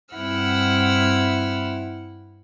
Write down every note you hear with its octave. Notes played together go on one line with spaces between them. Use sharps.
G2 C4 E4 F#5 E6 F6